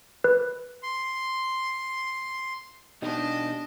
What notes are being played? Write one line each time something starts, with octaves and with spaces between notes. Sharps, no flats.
B4
C6
B2 D4 D#4 G4 D#5